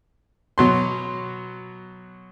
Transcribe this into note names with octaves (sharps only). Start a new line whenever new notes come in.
B2 F#3 C6